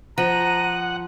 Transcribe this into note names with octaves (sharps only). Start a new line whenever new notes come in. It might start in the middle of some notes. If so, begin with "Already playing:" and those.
F3 F#5 A#5 D#7